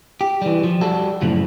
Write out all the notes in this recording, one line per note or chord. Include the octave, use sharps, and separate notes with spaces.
G4
E3 G3
F3
G3 F#4 A4
F#2 A2 C#3 F3